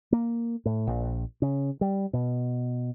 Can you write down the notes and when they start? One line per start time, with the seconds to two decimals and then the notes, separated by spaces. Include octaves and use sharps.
0.12 A#3
0.65 A2
0.87 A#1
1.42 C#3
1.81 G3
2.13 B2